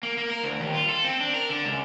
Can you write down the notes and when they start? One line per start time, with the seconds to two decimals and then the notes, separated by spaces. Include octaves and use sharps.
0.03 A#3
0.18 A#3
0.30 A#4
0.43 D2
0.60 D#2
0.74 F4
0.89 A4
1.04 C4
1.20 D4
1.34 A#4
1.50 D3
1.65 C#2